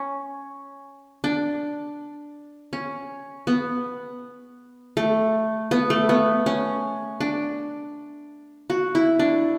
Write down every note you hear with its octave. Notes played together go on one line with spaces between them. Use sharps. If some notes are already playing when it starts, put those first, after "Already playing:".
Already playing: C#4
D4
C#4
B3
A3
B3
A3
B3
C#4
D4
F#4
E4
D4